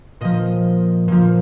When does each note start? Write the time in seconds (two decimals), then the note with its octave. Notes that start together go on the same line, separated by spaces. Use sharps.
0.21 A#2 F3 D#5
1.08 A#2 F3